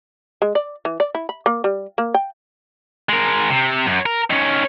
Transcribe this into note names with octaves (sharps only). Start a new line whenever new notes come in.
G#3
D5
E3
D5
E4
B5
A#3
G3
A#3
G5
G#3 A#4
C3
F#2
A#4
D#3 C#4